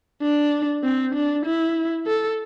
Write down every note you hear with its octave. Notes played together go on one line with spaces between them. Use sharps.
D4
C4
D4
E4
A4